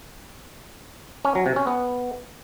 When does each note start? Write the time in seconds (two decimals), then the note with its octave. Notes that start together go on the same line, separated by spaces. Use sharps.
1.25 C#4
1.35 F#3
1.46 C3
1.56 C#4
1.67 B3